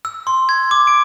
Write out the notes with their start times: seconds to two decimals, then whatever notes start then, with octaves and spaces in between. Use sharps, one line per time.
0.05 E6
0.27 C6
0.49 G#6
0.71 D6
0.87 D7